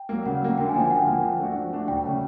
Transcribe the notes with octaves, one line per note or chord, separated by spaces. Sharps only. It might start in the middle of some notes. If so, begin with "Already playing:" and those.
Already playing: G5
F#3 A#3
C#3 F#5
F#3 A#3
D3 G5
G#5
F3 A#3 G5
D3 F#5
F3 A#3
F3
A3 D4 F#4
F3
A3 D4 F#4
D2 G5
C#3 F#3 A3 C#4